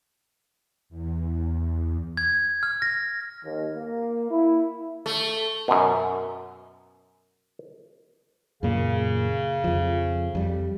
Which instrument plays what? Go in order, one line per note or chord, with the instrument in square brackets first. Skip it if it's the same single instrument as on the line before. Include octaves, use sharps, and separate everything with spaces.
[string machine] E2
[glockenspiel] G#6
F6
A#6
[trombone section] D#2
A#3
E4
[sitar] A3
[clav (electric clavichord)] F#2 B2
[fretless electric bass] F#2 A#2 A#3 [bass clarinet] C#3
[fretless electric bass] F2 F3
F2 G3